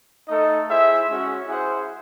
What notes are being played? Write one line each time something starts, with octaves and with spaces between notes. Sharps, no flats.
A3 D#4 A4 D#5
E4 G#4 C5 E5
G#3 C#4 F#4
E4 G#4 C5 F#5